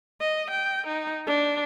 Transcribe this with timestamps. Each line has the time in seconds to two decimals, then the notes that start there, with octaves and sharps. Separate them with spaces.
0.20 D#5
0.51 G5
0.87 D#4
1.27 D4